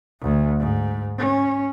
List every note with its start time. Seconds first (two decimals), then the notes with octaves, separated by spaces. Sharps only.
0.21 D2
0.59 G#2
1.18 C#4